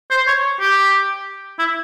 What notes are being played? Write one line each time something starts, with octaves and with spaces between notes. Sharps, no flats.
C5
C#5
G4
E4